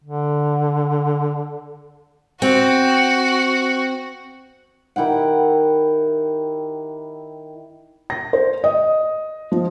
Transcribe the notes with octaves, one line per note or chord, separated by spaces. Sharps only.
D3
C4 F#4
D#3 E4 G4 F#5
A#6
C5
D#5
F3